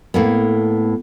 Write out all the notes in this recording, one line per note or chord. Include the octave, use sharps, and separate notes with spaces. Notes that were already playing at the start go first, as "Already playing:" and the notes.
A2 A#3 B3